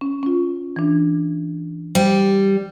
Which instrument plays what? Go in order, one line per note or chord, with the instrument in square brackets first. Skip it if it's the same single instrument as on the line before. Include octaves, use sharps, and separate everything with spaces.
[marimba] C#4
C#4 F4
E3 D4
[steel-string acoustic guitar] G3 [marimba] C5